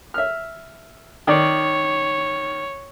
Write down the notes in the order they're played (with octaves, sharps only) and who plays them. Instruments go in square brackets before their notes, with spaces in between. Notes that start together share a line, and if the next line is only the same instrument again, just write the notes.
[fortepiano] E5 F6
[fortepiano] D#3 D5 [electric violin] C#5